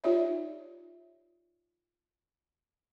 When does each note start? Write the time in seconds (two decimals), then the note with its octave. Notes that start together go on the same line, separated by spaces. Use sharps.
0.04 D#4 F4 G4 C#5 D5 E5